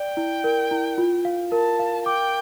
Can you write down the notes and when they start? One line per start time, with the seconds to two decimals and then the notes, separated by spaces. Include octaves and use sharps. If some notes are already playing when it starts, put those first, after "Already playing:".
Already playing: D5 G5
0.17 E4
0.44 A#4
0.71 E4
0.98 F4
1.25 F5
1.52 A#4 A5
1.79 F5
2.06 G5 D6